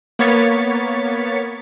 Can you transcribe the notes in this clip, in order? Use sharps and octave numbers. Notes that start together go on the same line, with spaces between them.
A#3 B3 C#5 A6 B6 C#7